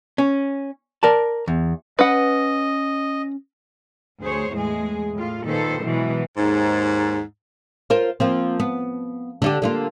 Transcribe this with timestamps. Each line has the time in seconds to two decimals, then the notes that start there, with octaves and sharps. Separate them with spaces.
0.18 C#4
1.03 A#4 D5 A5
1.48 E2
1.99 C#4 B4 D#5 F#5
4.21 D2 G#4 C5 C#5
4.52 E2 A2 G#3 G#4
5.15 A2 F4
5.45 A#2 D#3 A4 B4 C5
5.83 B2 E3 F#3 G#3
6.37 D#2 G#2
7.90 F4 A#4 C5
8.20 F3 A#3 C4
8.60 B3
9.42 D3 F4 G4
9.62 D3 A#3 F4